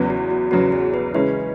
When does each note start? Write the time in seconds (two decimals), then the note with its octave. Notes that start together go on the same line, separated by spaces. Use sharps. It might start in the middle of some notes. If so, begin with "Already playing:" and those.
Already playing: E2 C#3 F#3 B3
0.10 F#4
0.30 F#4
0.51 E2 C#3 F#3 B3 F#4
0.72 G#4
0.94 B4
1.14 C#3 E3 G#3 C#4 B4